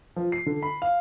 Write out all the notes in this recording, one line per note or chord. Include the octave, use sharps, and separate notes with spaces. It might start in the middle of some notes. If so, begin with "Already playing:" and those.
F3
C7
D3
B5
F5